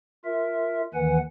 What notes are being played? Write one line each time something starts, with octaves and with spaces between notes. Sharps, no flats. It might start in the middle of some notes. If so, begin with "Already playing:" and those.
F4 A#4 E5
D#2 D#3 E3 B4 F#5 G#5